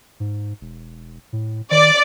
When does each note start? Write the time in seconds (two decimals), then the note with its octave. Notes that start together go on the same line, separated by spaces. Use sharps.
0.20 G#2
0.61 E1
1.33 A2
1.71 D#3 D5